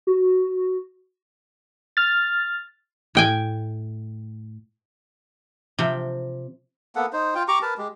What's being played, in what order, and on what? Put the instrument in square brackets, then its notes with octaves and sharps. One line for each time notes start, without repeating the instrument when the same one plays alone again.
[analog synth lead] F#4
[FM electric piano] F6 A6
[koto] A2 G5 G#5
[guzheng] C3 F3 G5
[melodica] A#3 B3 A4 F#5
D#4 C5
F4 G5
G4 A#5 C#6 D6
A#4 B4 A5
G#3 G4